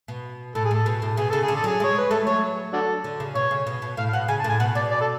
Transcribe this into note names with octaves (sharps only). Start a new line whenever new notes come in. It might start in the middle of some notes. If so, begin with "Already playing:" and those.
B2
A2 A4
G#4
A2 A4
B2
A2
B2 G#4
C#3 A4
G#4
D3
A4
F#3 G#4
G#3 C#5
B4
A3 A4
F#3 C#5
D4 F#4 A4
D3
C#3
B2 C#5
C#3
B2
B2
A2 F5
F5
B2 F#5
C#3 G#5
A5
A2
G#5
B2 F#5
B2 D5
D5
A4